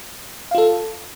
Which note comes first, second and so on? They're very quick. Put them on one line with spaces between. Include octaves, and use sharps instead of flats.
F5 F4 A4